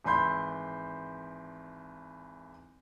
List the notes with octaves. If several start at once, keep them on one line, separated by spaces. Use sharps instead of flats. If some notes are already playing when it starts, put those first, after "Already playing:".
G#1 E3 B5 C6 G6